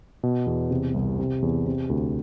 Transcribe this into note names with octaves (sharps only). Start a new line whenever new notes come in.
B2
E2
C3
C2
C3
E2
C3
D2